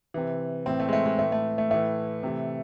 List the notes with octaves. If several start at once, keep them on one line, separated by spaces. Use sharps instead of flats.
C3 E3
A2 E3 C4
A3
G#3
A3
G#3
A2 E3 A3
A3
A3
A2 E3 A3
C3 E3